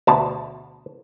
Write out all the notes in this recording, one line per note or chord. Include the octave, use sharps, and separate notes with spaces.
D2 B2 A5